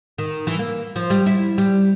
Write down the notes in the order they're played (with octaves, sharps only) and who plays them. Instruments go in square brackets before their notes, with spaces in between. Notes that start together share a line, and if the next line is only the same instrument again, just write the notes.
[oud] D#3
E3
A#3
F3
G3
E4
G3